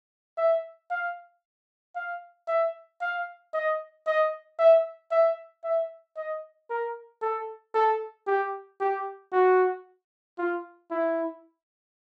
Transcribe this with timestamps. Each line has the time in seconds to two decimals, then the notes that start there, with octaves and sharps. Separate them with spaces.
0.38 E5
0.90 F5
1.95 F5
2.48 E5
3.01 F5
3.54 D#5
4.07 D#5
4.59 E5
5.11 E5
5.64 E5
6.17 D#5
6.70 A#4
7.22 A4
7.74 A4
8.27 G4
8.81 G4
9.32 F#4
10.39 F4
10.91 E4